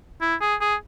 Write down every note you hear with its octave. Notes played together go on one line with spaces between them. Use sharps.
E4
G#4
G#4